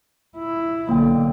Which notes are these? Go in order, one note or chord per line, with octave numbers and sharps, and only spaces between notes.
E4
B1 D3 A#3 G5